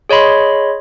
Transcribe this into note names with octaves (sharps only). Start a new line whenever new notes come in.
G#4 C#5 D#5 B5 C6